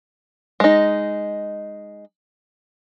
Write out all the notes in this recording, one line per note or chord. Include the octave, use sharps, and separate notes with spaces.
G#3 D#4